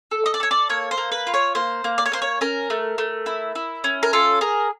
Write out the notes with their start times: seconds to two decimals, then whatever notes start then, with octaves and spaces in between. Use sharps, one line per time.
0.11 A4
0.26 D#5
0.34 D5
0.40 A4 C#5
0.51 D5
0.69 A#3 C#5
0.91 C5
0.97 A#3
1.12 B4
1.27 F4
1.34 C#5
1.55 A#3 C5
1.84 A#3
1.98 D5
2.06 C#5
2.12 A#3 C5
2.22 C#5
2.41 C#4 A#4
2.70 A3
2.98 A3
3.26 E4
3.55 E4
3.84 C#4
4.03 A#4
4.13 F4 A4
4.41 G#4 A#4